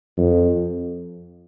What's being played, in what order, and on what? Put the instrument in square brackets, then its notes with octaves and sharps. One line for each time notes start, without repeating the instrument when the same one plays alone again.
[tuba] F2